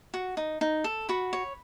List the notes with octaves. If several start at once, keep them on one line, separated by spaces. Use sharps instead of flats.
F#4
D#4
D#4
A4
F#4 B5
C#5